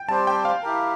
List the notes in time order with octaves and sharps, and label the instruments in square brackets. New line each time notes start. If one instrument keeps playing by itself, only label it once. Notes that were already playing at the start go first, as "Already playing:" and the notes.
Already playing: [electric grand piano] G5
[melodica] G3 C4 G4 C5 [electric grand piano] A5
[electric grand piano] G5
F5
[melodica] E4 G4 A#4